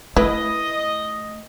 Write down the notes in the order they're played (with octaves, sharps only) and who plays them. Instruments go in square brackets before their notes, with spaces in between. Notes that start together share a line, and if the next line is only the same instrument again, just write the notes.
[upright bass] A3 [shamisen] E4 B4 [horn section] D#5